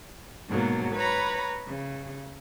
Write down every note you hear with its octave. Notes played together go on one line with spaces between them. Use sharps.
G#2 B2 F#3 A#3
B4 C#5 A#5 B5
C#3